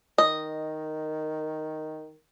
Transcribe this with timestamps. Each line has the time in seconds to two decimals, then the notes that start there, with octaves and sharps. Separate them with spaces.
0.18 D#3 D#5